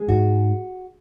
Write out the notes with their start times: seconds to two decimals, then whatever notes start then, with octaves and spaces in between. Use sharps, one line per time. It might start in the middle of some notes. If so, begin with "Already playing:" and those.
Already playing: G#3
0.08 G#2 F#4